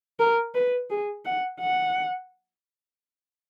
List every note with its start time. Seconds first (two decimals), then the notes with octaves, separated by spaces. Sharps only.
0.19 A#4
0.55 B4
0.90 G#4
1.25 F#5
1.60 F#5